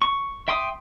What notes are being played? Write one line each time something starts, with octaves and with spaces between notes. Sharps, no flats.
C#6
E5 G5 C6 D6 D#6